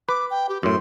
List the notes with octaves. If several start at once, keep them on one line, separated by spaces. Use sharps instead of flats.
B4 D6
G5
G4
F#2 A2 C6